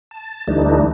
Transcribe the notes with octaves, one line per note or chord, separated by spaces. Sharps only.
A5
D2 E3 G3 A3 D4 D#4